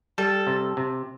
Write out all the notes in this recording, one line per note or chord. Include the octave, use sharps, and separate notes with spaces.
G3 A4
C3
C3